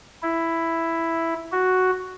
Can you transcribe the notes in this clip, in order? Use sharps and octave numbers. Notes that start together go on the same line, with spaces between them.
E4
F#4